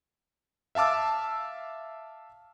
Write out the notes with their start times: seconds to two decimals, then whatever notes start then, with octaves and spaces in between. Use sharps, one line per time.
0.75 E5 F5 A5 D6 E6